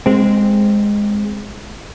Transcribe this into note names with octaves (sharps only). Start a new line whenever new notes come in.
G#3 C4